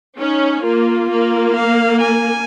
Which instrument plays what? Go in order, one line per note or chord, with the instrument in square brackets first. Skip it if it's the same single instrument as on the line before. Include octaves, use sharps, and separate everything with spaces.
[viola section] C#4 [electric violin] D#4
[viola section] A#3 [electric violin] F4
[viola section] A#3
[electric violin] F5
G#5